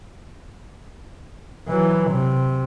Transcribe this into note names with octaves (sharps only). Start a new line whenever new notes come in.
E3 F#3
C3